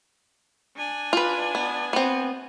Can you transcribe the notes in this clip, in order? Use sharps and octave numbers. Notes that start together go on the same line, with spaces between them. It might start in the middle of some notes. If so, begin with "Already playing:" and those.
D4 G#5
F4 B4
B3
B3 C4